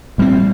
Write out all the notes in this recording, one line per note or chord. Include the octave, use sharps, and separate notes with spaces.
A#2 G3 C4